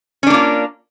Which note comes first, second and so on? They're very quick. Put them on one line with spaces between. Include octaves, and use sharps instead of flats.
C#4 D4 A#3 F4